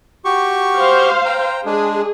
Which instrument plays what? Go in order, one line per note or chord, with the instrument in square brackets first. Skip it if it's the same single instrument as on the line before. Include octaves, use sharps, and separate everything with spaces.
[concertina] F#4 G4 C#6
[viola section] C5 F5
[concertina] G5 A#5
[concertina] G#3 D4 [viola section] G#4